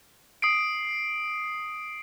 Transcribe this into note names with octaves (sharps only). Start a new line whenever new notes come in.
D#6 C7 D7